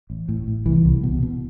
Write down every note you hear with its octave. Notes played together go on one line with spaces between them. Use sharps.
A1
A2
A2
C2 E3
C2
B2
B2